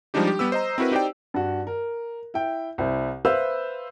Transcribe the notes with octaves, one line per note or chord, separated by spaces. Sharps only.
F3 G3 G#3 D4 D#4 G4
G4
G3 B3 G4 B4 E6
C5 D#5 A#5
C4 E4 F#4 A#4 B4
D#4 G4 C5 D5 G5
G2 F#4
A#4
E4 G5
C2 E4 C5
B4 C5 E5 F5 B5 E6